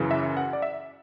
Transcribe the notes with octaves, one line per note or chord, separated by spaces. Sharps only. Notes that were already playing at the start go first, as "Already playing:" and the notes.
Already playing: F#2 C#3 E3
E5
F#5
D5
E5